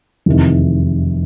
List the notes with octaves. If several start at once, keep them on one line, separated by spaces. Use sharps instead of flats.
F1 E2 C3 D#3